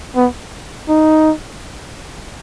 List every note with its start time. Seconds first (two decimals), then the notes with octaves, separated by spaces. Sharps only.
0.16 B3
0.89 D#4